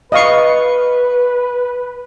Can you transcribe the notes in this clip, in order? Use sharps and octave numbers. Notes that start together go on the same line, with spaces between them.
B4 D#5 F5 C#6